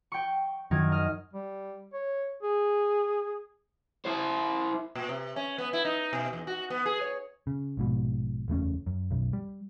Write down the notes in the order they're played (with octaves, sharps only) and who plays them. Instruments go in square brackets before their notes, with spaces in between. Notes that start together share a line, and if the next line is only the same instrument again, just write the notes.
[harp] G5 C#6
[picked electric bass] F#2 [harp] D#3 D#4 G#6
[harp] D#5 F6
[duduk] G3
C#5
G#4
[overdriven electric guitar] E4 C5
[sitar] A#2
C3
C#4
B3
E4
D#4
B2
E2
F#4
B3
G#4
C#5
[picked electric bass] C#3
A#1 G#2 B2
F#1 E2 A3 C#4
F#2
B1 F#2
G3